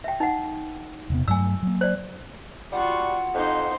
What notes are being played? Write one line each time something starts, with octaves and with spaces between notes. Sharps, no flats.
E5 G5
D#4 F#5
E1 C3 B3
G2 F#3 A3 G#5 E6
F#3 A#3
C5 D5
G3 F4 F#4 F#5
F2 D#4 C5